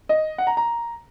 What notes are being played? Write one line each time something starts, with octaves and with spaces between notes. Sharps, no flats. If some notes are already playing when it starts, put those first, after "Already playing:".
D#5
F#5
A#5
A#5